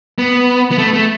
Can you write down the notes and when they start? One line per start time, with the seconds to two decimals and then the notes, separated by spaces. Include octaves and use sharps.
0.18 B3
0.71 B3
0.78 A3
0.93 A3